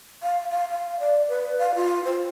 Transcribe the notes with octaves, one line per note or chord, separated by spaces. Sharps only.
F5
F5
F5
D5
B4
F5
F4
C5